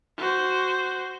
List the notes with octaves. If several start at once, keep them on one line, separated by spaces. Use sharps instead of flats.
F#4 C5